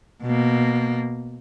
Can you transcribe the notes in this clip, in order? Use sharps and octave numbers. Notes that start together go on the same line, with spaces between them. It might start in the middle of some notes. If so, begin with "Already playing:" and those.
B2 A#3